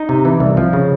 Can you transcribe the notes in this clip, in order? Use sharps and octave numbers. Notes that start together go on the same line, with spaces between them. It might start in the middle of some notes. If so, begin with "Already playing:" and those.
Already playing: D#4
C3
E3
C2
F3
C#3